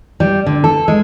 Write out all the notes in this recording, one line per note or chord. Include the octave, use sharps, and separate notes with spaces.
G3
D3
A4
G#3